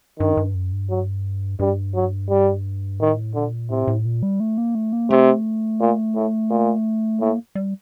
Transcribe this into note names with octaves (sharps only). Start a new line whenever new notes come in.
G2 D#3
G2
F#2
G2
F#3
G2 G3
F#3
G3
A2 D#3
A#2 D3
A2 C3
A2
A#2
G3
A3
A#3
A3
A#3
C3 A3
A#2
A2
A#2
A2 A#3
G3